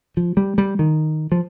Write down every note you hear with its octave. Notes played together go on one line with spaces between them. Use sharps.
F3
G3
G3
D#3
F3